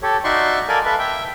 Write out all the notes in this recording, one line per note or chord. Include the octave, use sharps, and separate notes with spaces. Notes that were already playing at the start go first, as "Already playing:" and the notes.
G4 A4 C#5
D#4 F#4 D5 E5 C6 C#6
A4 A#4 D5 F5 G#5
A4 B4 E5 F5
E5 G5